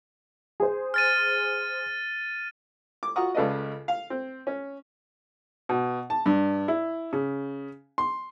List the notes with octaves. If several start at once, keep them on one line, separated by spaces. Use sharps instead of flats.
G#4 C5
F6 A6 D#7
D6
F4 F#4 F#5 A#5 C#6 D#6
C#2 C#3 A4 B4 D5 D#5
F5
C4
C#4
B2
A5
G2
E4
C#3
C6